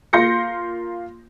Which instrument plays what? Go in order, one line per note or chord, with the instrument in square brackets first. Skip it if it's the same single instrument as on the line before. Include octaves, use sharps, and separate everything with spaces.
[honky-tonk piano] A#3 F4 C6 G6 A#6 C#7